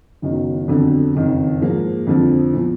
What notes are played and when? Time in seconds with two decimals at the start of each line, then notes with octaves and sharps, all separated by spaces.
0.22 F#1 F#2 D#3 F#3 B3
0.68 F2 D3 F#3 B3
1.15 F#1 F2 D#3
1.61 G#2 F3 A#3
2.07 F2 D3 F3
2.54 A#2 F3 B3